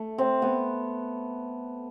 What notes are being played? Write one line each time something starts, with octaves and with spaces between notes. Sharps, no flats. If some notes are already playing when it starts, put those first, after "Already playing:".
Already playing: A3
C4
B3